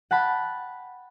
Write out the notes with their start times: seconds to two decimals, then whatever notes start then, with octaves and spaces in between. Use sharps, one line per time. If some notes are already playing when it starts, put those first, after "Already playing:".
0.11 F#5 G5 A5 B5